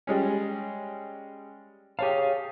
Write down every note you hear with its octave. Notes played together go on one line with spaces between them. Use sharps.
G3 G#3 C#4
G4 G#4 C#5 F5 A5